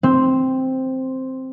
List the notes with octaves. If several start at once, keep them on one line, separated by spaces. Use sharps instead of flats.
C4